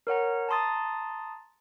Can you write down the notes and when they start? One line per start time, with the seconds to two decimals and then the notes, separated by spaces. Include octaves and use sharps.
0.07 A#4 C#5 F#5 A#5
0.49 A5 A#5 C6 D#6 A6